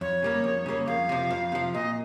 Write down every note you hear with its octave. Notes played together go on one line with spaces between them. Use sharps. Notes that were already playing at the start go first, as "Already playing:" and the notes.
F2 C#5
C#3 G3 A#3
F2
C#3 G3 A#3
F2 F5
C3 F3
F2
C3 F3
A#2 D#5